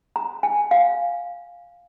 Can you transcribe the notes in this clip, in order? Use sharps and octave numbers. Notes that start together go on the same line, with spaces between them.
A#5
G#5
F5